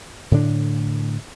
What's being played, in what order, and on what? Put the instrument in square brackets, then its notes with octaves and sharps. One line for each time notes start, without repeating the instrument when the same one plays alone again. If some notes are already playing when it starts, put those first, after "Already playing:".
[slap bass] A2 D3 D4